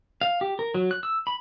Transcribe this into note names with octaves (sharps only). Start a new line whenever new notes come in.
F5
G4
A#4
F#3
F#6
E6
B5